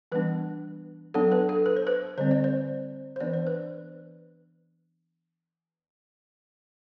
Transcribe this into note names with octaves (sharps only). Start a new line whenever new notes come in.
E3 G3 B3 D4 B4
F#3 B3 D4 A4
B4
A4
B4
C5
B4
D3 G3 C4 C5
D5
C5
C5
E3 B3 D4 D5
C5
B4